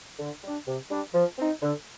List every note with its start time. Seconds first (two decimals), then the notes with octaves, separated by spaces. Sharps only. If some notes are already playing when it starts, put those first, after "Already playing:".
0.19 D3
0.43 G3 D4
0.67 C3
0.90 G3 D4
1.14 F3
1.38 C4 D#4
1.62 D3